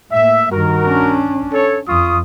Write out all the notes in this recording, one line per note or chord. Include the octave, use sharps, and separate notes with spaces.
A2 A#3 E5
G2 D#3 F#4 A#4
C#4 D4
A4 C#5
F2 F4 C#6 D#6